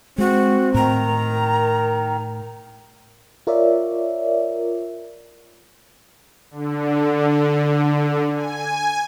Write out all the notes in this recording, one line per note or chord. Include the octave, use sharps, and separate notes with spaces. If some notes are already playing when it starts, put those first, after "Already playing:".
G#3 C4 F#4
A2 D#3 A#5
A#4
F4 A#4 C#5 D5 E5
D3
G#5